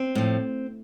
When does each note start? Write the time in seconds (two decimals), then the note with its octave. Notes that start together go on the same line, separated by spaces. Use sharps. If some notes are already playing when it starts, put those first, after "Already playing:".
Already playing: C4
0.15 A2 F3